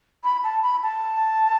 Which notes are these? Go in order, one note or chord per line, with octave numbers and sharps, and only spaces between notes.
B5
A5
B5
A5